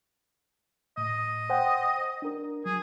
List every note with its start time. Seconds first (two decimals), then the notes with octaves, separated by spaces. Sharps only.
0.98 A2 D#5
1.50 C5 F#5 G5
2.22 D4 A#4
2.66 F#3 G#4